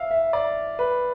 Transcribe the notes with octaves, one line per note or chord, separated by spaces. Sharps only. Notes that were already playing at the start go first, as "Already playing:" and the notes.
Already playing: E5 F5
E5
D5
B4